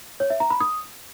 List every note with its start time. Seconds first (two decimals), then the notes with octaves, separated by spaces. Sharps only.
0.20 C#5
0.30 E5
0.40 A#5
0.50 B5
0.60 D#6